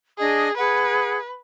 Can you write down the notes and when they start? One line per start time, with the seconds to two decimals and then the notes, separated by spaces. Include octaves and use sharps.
0.18 D4 G#4 D#5 D#6
0.57 G#4 B4 F#5